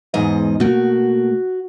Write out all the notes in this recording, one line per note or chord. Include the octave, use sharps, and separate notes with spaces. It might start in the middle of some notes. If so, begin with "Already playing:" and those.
E2 G#2 D#5
B2 A3 A#3 F#4